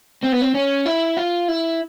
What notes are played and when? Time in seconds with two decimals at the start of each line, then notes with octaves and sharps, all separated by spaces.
0.23 C4
0.32 B3
0.41 C4
0.54 C#4
0.86 E4
1.17 F4
1.48 E4